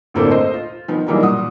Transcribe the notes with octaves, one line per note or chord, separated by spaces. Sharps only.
D2 A2 A3 A#3 C4 D4
C5 D#5
F4
D#3 F3 B3
E3 F#3 G3 A#3 D4 D#4
A#2 F#5 D#6